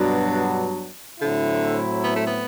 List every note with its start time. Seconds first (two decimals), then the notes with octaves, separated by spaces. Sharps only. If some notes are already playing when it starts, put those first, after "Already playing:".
Already playing: G2 B2 F#3 B3 D4
1.20 A2 D3 F#3 C4 E4
2.04 B3
2.16 A3
2.27 B3